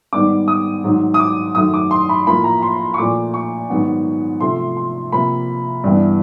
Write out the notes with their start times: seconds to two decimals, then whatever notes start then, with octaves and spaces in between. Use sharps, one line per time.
0.13 G#2 D#3 G3 B3 D6
0.48 D#6
0.84 G#2 D#3 F#3
1.14 D#6
1.20 D6
1.55 F#2 D#3 F#3 A3 D#6
1.74 D6
1.91 C6
2.09 B5
2.27 A2 F3 A#3 B5
2.44 A#5
2.63 C6
2.94 C#6
2.98 A#2 F3 A3 D6
3.34 C#6
3.70 G#2 D#3 F#3 B3
4.40 C3 F3 A3 C6
4.77 C6
5.12 C3 F3 A#3 B5
5.84 G2 E3 G3 B3